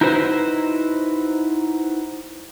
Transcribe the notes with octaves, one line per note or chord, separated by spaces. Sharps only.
D#4 E4 F#4 B4 C5